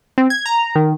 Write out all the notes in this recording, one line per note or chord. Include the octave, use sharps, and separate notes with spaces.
C4
G#6
A#5
D#3